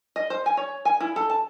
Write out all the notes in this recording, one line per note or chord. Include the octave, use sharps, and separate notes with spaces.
D#5
C5
G#5
C#5
G#5
E4
A4
A5